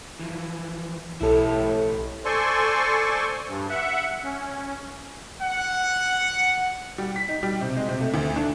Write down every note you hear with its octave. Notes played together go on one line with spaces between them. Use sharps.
E3 F3
B1 A2 E4 G4 A4 C#5
A4 C5 D5 G#5 C6 C#6
G2
E5 F#5
C#4
F#5
G3
B6
D#4
G3
C3
G#3
C3
A3
D2
D4